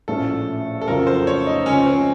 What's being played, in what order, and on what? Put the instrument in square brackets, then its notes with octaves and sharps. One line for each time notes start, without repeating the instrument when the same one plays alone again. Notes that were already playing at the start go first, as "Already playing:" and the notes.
[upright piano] A#1 A2 A3 C#4 [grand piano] A4
[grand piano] A4
[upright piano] F2 C#3 F#3 C4 F4 [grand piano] A#4
[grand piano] C5
C#5
D#4
[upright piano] C#2 C#3 F3 [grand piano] C#4
[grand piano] C4